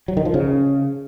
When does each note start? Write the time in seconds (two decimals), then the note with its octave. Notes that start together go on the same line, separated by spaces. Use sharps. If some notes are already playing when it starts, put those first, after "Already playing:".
0.08 F#3
0.17 D#3
0.25 F3
0.34 C#3